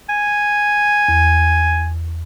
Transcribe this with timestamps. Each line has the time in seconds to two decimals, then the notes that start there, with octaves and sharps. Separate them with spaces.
0.09 G#5
1.08 E2